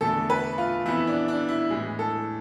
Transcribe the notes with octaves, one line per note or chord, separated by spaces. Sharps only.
E2 D3 A3 A4
B4
F4
F2 E3 B3 E4
D4
D4
E4
A2 E3 G#3
A4